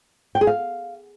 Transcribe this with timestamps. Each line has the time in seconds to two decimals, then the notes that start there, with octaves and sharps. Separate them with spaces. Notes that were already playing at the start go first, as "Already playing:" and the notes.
0.35 G5
0.41 G#4
0.47 F5